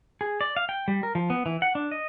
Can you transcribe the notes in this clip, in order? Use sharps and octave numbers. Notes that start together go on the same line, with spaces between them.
G#4
D5
F5
G5
G3
A#4
F3
B3
E3
F#5
D4
D#5